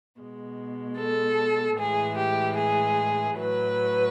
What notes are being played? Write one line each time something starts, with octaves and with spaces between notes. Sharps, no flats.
B2 G#3
A4
A2 E3 G#3 G#4
G4
G#4
A2 F#3 B4